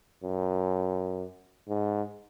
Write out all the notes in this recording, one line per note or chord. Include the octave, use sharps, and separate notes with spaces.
F#2
G#2